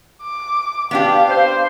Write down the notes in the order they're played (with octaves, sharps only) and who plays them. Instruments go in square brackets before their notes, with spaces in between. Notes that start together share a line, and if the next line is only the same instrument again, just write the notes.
[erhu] D6
[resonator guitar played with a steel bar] B3 D4 G4 [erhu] F5
[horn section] C5